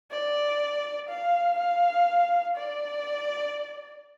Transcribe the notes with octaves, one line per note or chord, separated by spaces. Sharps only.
D5
F5
F5
D5